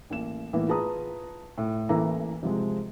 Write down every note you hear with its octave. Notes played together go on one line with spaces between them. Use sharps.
A1 A#3 E7
A2 E3 A#3 B3
F4 G#4 B4 A5 A#5 D#6
A2
A1 E3 A#3 A4 E5 A#5
C3 F3 G#3